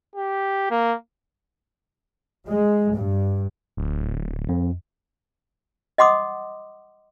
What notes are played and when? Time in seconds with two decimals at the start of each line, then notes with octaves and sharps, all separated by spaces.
0.16 G4
0.70 A#3
2.46 G#3
2.92 G2
3.77 D1
4.49 F2
5.98 D#5 F#5 C6 D6 D#6